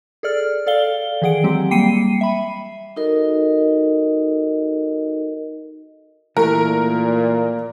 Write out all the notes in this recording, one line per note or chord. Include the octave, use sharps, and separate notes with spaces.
G#4 A4 D5 F6
A4 D5 F5 G7
D#3 E3 G#4 F#5 D7
F#3 G#3 C4 G4
G3 A#3 G5 C7 C#7 D#7
E5 B5
D#4 F#4 A4 A#4 D#5
A#2 E3 A3 A#4